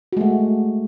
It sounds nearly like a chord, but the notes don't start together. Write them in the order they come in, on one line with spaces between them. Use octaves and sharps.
F#4 G#3 A3